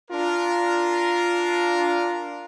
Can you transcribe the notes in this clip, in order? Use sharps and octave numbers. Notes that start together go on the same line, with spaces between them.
D4 F4 A#4